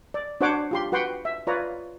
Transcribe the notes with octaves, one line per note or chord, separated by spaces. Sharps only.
D5
D4 F#4 C5 C#5 F#5 D6
F4 G4 C6
F#4 B4 F#5 G5 C6
E5
F4 B4 C#5 D5 A#5